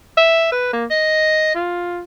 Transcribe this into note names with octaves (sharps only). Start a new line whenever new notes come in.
E5
B4
A#3
D#5
F4